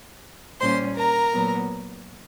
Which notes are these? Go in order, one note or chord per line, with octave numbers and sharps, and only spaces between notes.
A#2 G3 A#3 C#4 C5 C6
A#4 A#5
A#2 F#3 B3